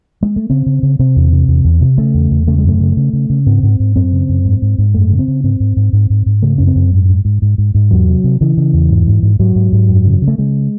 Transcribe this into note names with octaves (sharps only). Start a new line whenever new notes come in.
G#3
A3
C#3 C4
C#3
C#3
C3 C4
E2
C3
E2
E2
C3
C#3 A3
E2
E2
C#3 A3
G#3
F#2 A3
C#3
C#3
C#3
C#3
G#2 C4
G#2
G#2
F#2 C4
C#3
F#2
G#2
G#2
G#2
F#2 A3
C#3
C4
C#3
G#2 C4
G#2
G#2
G#2
G#2
G#2
C#3 A3
F#2 C#4
C4
F#2
G#2
G#2
G#2
G#2
G#2
G#2
E2 F#3
C3
C3
C#3 E3
C#3
E2
G#2
G#2
G#2
G#2 F#3
G#2
G#2
F#2
C#3
C#3
A3
C#3 G#3